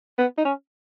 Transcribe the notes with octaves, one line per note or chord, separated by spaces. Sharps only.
B3
D#4
C#4